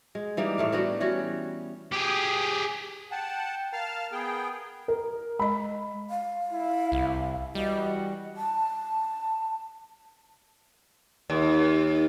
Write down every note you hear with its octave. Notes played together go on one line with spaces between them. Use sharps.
G#3
E3 G3 A#3 D#4
A2 A3 F5
G3 B3 D4 F#4
E3 G3 C#4 F#4
G4 G#4
F#5 G5 A5
A#4 F5 A5 F6
B3 G#4 G5
A#4
G#3 D#5 B5
F5
E4
C2
E3 G3 F#4 D#5
A5
D#2